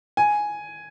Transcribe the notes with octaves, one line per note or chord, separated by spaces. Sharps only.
G#5